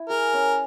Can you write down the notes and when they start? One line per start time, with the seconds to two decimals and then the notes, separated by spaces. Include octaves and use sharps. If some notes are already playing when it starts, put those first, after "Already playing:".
Already playing: E4
0.09 G#4 A#4
0.33 C#4